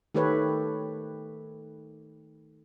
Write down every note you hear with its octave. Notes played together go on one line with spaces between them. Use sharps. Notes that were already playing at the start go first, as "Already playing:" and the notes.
D#3 A3 G4 A4 B4 C#5